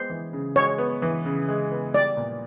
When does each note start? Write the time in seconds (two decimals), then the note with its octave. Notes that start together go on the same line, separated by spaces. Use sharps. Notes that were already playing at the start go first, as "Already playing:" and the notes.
Already playing: G#3 B3 C5
0.10 E3
0.33 C#3
0.56 G#3 C#5
0.78 B3
1.02 E3
1.25 C#3
1.49 G#3
1.71 B3
1.94 G3 D5
2.17 A#2